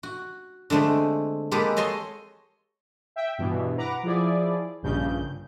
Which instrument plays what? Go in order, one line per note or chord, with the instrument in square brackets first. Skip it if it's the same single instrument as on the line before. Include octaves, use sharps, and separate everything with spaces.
[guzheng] F#4
D3 G#3 A3 C4
G#3 A#3 G4 A4 B4
C#5 D#5 A5 C6
[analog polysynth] E5 G5
G2 B2 E3
B4 F#5 A#5 D6
F3 E4 G#4 D5
A#1 G2 C#3 G6